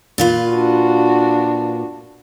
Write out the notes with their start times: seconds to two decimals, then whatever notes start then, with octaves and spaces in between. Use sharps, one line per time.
0.18 A#2 F4 B4
0.51 D4 F#4